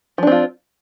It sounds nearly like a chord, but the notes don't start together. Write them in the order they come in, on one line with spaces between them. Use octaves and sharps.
F3 D4 C4 F4